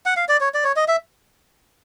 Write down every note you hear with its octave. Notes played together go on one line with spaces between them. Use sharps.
F#5
F5
D5
C#5
D5
C#5
D#5
E5